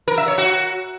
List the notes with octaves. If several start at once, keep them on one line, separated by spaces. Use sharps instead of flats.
A#4
E5
C#5
F#4